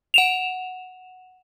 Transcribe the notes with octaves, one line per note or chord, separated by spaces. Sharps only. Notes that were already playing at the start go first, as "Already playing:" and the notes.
F#5 E7 F7